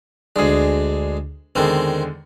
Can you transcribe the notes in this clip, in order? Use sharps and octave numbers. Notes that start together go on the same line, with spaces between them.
D2 G#3 D4 G#4
E2 D3 D#3 G#3 C4